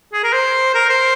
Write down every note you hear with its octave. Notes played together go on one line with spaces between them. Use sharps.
G#4
A#4
C5
A#4
C5